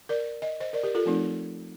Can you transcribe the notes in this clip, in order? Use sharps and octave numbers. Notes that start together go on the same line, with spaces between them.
A#4 D5
D#5
C5 D#5
A#4 D5
G4 A#4
F4 A4
F3 A3 C4 D#4 F4